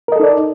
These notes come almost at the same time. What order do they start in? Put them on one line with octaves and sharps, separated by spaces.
A#4 D#5 A4 D#4 D5